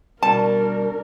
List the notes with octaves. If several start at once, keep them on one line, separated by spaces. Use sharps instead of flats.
B2 G3 D4 A#4 A5